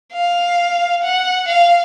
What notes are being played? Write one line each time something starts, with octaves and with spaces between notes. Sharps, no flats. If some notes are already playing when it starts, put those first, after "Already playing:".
F5
F#5
F5